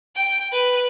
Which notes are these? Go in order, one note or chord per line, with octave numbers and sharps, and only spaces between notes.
G5
B4